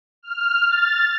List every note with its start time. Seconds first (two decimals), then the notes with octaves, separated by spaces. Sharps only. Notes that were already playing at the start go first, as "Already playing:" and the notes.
0.23 F6
0.68 A6